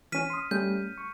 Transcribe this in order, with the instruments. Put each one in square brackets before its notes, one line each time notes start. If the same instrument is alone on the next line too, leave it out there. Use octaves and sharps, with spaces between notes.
[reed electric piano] E3 C#4 [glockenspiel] F6 B6 D#7
[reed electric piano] C6 D#6
[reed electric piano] G3 A3 C#4 [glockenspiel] G6
[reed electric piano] C#6